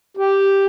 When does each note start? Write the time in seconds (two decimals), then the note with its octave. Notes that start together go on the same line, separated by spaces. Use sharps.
0.17 G4